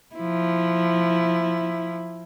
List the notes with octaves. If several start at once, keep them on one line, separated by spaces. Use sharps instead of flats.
F3 E4